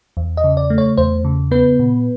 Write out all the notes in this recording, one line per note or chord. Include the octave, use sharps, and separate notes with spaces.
E2
D#5
C#3
D5
A3
C#5
E2 C5
C#3
B3 B4
A#2